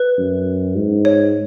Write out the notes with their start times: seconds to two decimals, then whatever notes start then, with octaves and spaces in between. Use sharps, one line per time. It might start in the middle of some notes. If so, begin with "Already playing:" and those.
Already playing: B4
0.18 F#2
0.76 G#2
1.05 C#5